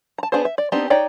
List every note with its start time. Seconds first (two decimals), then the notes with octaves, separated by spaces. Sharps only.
0.18 A5 A#5
0.32 B3 D4 G#4 C5
0.45 E5
0.58 D5
0.72 B3 C4 D4 D#4 G4
0.90 D#4 C#5 D5 G5